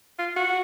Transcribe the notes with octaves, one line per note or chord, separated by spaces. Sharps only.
F4
F#4